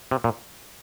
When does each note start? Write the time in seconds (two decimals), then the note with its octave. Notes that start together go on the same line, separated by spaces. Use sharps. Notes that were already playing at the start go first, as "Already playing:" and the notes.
0.11 C3
0.24 A#2